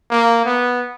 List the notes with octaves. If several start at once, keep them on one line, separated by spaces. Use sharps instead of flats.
A#3
B3